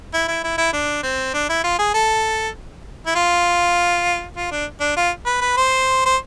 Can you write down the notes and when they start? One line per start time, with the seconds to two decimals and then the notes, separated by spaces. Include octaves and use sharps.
0.14 E4
0.28 E4
0.44 E4
0.58 E4
0.73 D4
1.03 C4
1.34 D4
1.49 E4
1.64 F4
1.79 G#4
1.94 A4
3.06 E4
3.16 F4
4.36 F4
4.51 D4
4.80 D4
4.97 F4
5.26 B4
5.41 B4
5.57 C5
6.05 C5